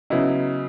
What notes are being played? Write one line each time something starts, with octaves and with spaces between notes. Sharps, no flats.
C#3 F#3 B3 D#4 E4